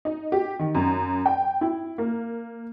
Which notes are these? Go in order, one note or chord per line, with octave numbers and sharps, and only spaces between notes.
D#4
G4
D#3
F#2
G5
E4
A#3